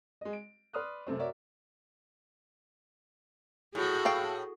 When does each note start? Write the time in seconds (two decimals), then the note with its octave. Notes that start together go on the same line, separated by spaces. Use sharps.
0.21 G#3 D#5
0.33 D7
0.73 B4 D5 C6 D#6 F6 F#6
1.07 F#2 C3 A3 C4
1.18 F#4 A#4 C#5 D5 E5
3.75 A2 F#4 G#4
4.05 A4 F5 G5